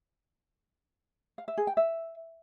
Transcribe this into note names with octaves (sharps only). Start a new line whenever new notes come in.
F5
E5
G#4
G5
E5